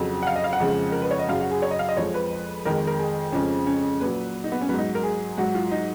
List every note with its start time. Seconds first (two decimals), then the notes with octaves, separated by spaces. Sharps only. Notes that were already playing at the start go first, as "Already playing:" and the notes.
Already playing: F2 C#3 F#3
0.23 F#5
0.27 F5
0.36 D#5
0.44 F5
0.53 F#5
0.60 F2 C#3 F3 G#3
0.92 A#4
1.02 B4
1.11 C#5
1.19 D#5
1.29 F#2 C#3 F#3 F5
1.41 F#4
1.51 G#4
1.62 C#5
1.71 D#5
1.79 F5
1.89 D#5
1.97 F2 F3 G#3 C#5
2.14 B4
2.65 F2 D#3 G#3 A#4
2.87 A#4
2.99 G#4
3.32 F2 C#3 F3 G#3 C#4
3.67 C#4
4.01 A#2 F#3 B4
4.44 D#4
4.52 B3
4.61 C#4
4.69 G#2 F#3 B3
4.78 D#4
4.95 A#4
5.03 G#4
5.37 G#2 F#3 F#4
5.55 F4
5.71 D#4